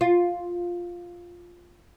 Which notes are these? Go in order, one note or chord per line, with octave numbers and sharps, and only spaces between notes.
F4